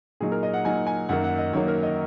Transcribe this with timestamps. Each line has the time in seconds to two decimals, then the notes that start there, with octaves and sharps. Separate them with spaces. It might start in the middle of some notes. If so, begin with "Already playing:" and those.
0.20 A#2 F#3 D#4 G#4
0.32 A#4
0.43 D#5
0.54 F#5
0.65 A#2 F#3 D#4 G#5
0.87 G#5
1.09 F#2 D#3 F#3 A#3 F#5
1.24 F#5
1.38 D#5
1.53 F#2 D#3 F#3 A#3 C#5
1.68 A#4
1.83 D#5